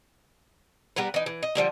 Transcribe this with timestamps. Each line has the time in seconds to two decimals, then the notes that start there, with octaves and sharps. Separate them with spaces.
0.96 G3 B3 A#4 B4
1.14 E3 D#4
1.26 E3
1.43 D#5
1.55 D3 F3 G3 A#3